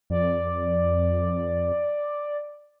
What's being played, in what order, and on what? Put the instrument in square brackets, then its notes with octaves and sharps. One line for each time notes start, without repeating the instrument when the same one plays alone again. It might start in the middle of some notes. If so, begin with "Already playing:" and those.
[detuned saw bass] F2 [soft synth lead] D5